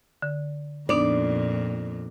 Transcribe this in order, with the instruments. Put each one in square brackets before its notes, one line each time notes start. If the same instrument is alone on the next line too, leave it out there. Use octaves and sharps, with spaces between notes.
[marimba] D3
[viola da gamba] F2 A#2 [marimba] B3 D4 D#4 [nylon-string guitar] D5